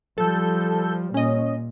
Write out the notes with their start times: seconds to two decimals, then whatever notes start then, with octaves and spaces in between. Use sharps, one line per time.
0.18 F3 G3 A4 G6
1.14 A#2 C#4 D#5